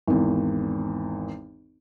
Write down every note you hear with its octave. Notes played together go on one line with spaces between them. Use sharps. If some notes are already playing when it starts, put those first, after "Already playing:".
G#1 E2